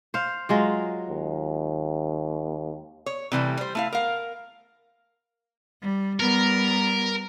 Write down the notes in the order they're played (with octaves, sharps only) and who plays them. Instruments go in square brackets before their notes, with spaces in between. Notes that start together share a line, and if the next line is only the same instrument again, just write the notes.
[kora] C5 F5
F#3 G#3 F4
[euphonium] D#2
[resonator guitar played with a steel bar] C#5
C3 E3 G3 A3
G3 C5
A3 E4 F5
A#4 F5
[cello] G3
[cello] G3 B3 [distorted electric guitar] A#4